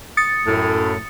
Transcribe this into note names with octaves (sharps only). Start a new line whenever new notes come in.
D#6 A6 C#7
F#2 A2